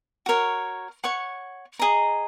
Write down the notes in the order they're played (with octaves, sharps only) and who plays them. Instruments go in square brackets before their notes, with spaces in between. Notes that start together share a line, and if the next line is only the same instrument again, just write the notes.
[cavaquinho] F#4 A#4 C#5
C#5 F#5 C#6
G#4 D#5 A#5